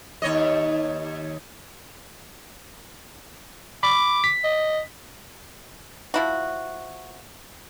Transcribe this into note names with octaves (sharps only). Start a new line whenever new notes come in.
D#2 C#5 D#5
B5 D6
B6
D#5
F3 E4 F#4